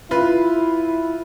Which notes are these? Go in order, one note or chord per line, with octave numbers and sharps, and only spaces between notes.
E4 F4 B4